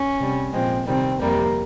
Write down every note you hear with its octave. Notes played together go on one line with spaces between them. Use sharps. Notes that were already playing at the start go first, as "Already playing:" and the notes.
Already playing: C#4
C3 G3
A#2 F3 G#3 C4
C3 D#3 G3 C4
F2 C3 G3 A#3